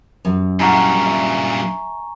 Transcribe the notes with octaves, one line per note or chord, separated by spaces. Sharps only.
F#2
G2 A#2 E4 F#5 G#5 A#5 C#6
E5 A#5